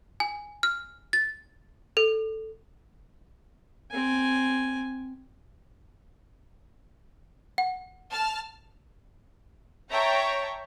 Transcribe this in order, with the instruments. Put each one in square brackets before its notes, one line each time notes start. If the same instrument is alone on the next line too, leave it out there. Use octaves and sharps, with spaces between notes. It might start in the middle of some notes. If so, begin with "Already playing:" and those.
[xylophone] G#5
F6
A6
A4
[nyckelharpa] C4 G#5
[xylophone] F#5
[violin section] A5 F6
C#5 E5 G5 A5 A#5